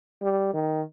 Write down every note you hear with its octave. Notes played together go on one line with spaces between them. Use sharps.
G3
D#3